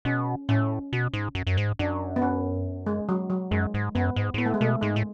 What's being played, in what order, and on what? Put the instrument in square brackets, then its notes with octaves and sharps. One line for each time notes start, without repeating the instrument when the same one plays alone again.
[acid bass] B2 [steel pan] C#4
[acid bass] A2 [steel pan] C#4
[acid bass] B2
G#2
F#2
F#2
G#2
[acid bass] F#2 [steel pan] D4
[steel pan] B3
C#4
G#3
F#3
F#3
[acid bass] F#2 [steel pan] G#3
[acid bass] G#2
[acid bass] F#2 [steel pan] B3
[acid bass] G#2
G#2
[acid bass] A2 [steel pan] B3
[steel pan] A3
G#3
[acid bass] B2 [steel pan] A3
[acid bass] G#2 [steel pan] G#3
[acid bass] A2